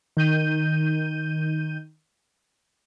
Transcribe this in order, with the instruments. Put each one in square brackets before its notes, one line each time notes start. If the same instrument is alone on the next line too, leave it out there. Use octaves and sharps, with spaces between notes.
[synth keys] D#3 G6 D#7